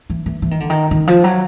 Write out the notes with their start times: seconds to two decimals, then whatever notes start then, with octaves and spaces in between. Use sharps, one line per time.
0.10 E3
0.26 E3
0.42 E3
0.51 D#3
0.60 D3
0.70 D#3
0.91 D#3
1.07 F3
1.24 F#3